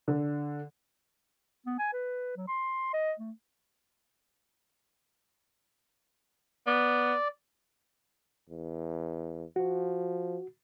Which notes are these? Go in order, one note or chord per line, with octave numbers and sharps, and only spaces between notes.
D3
B3
G#5
B4
F#3
C6
D#5
A3
B3 D5
E2
F3 F#4